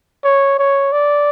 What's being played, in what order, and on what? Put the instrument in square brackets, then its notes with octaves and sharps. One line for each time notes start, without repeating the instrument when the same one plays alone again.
[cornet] C#5
C#5
D5